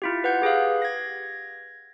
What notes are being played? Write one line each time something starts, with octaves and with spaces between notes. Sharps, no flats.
E4 F4 G4
B4 F#5 G6
G4 G#4 B4 F5
G#6 A#6